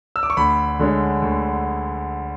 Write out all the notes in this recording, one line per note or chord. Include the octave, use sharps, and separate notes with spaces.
E6
D6
C#6
D2 B5
D3 G#3 C#4
D2